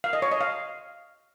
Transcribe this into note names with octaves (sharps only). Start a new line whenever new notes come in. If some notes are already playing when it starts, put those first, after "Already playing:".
F5
D#5
C#5
D#5
F5